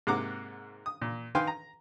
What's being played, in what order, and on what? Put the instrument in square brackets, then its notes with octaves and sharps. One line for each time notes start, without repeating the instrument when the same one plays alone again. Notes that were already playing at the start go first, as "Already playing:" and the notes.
[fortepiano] G#2 C3 A#3 F#5 A#5 D6
D#6
A#2
D#3 B4 F5 G5 G#5 C6
A#5